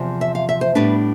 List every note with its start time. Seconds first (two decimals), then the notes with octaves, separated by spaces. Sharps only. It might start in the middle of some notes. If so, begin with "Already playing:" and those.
Already playing: E2 C3 F3
0.21 E5
0.35 F5
0.49 E5
0.61 C5
0.75 A2 G3 B3 D4 B4